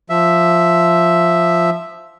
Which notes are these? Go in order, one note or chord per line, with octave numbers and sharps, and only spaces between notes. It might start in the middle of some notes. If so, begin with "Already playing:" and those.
F3 E5